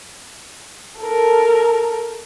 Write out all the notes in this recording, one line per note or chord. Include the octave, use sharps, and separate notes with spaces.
A4 A#4